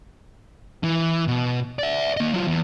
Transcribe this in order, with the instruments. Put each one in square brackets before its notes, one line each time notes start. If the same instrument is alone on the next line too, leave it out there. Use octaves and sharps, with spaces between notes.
[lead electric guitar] E3
B2
D5 E5
A#3 D#5
F#3 F4
E2